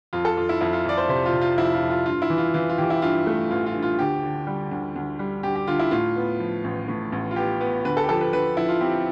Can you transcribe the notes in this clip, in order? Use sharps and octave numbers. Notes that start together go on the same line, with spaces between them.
F2 F4
A4
F2 F4
E4
F2 E4
F4
F2 D5
C5
C3 C5
F4
C3
F4
F2 E4
F4
F2
F4
G2 F4
E4
E3
F4
E3 F4
F4
E3 G4
E4
G2 F4
A3
A1 F4
F4
G2
F4
D2 G4
D3
G3
D2
D2
G3
D2 G4
G4
D3 F4
E4
A2 F4
B3
F3
A1
A2
A1
F4
B3 G4
B3
D2 B4
A4
G4
F3 A4
B4
D2 B4
F3 E4
F4
C4 G4